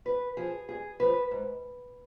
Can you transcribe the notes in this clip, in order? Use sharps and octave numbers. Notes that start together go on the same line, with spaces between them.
G2 B4
F3 G#4
G2 G#4
F3 B4
G#2